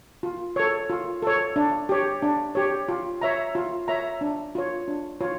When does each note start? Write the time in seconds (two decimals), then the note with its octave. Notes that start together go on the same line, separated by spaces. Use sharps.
0.23 F4
0.56 A4 C#5
0.90 F4
1.22 A4 C#5
1.56 D4
1.89 G4 C#5
2.22 D4
2.55 G4 C#5
2.89 F4
3.22 C#5 E5 A#5
3.55 F4
3.88 C#5 E5 A#5
4.21 D4
4.55 F4 C#5
4.88 D4
5.21 F4 C#5